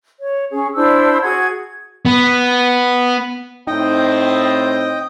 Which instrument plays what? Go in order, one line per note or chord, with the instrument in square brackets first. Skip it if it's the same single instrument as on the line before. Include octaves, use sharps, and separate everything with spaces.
[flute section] C#5
C#4 G#4
D4 E4 C5 E6
F#4 G#4 F#5 G#6
[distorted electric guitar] B3
[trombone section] A2 C4 [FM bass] D#4 [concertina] D#5 G5 D#6